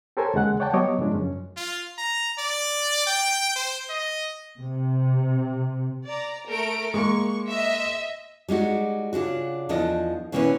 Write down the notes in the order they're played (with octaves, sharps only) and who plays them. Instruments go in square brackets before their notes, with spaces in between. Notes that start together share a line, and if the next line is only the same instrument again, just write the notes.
[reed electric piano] G4 A4 A#4 C5 C#5 G#5
D#2 C#3 G#3 F#5 F#6
C#5 D5 F#5 G5 A5
F#3 G3 B3 C#5 D#5 D6
G2 C#3 F3 G#3 D4
F#2 C#4
[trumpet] F4
A#5
D5
G5
C5
D#5
[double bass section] C3
[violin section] D5 A#5
A3 A#4 D7
[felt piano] G#3 A#3 [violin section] C#6
[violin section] D#5 E5
[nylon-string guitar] G3 G#3 D#4 F#4
C#3 D4 F4 F#4
E2 F3 D4 A4 D#5
B2 E3 A#3 C#4 D4 B4